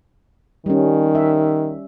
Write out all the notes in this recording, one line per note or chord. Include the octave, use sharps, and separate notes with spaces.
D#3 G3 C#4
E5